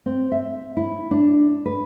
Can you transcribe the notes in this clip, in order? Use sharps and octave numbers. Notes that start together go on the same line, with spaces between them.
C4
E5
E4
D4
B4